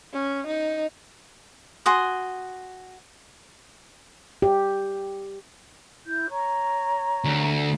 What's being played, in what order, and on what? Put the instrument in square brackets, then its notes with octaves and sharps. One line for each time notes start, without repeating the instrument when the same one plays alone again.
[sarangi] C#4
D#4
[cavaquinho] F#4 G#5 C6 D#6
[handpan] G4
[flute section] E4 G6
C#5 A#5 C#6
[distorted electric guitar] D2